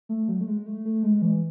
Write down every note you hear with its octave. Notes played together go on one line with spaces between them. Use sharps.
A3
F#3
A3
G#3
A3
A3
G#3
E3